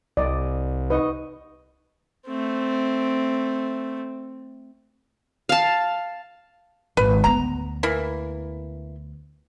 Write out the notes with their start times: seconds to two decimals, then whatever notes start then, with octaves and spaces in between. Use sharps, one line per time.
0.17 C2 D5 D#5
0.90 D#4 B4 D#5 C#6
2.27 A3 C4
5.49 F5 A5
6.97 G#1 B4
7.24 D2 B3 A#5
7.83 E3 A#3 E4